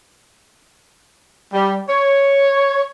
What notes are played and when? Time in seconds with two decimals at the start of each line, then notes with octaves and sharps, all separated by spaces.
1.53 G3
1.89 C#5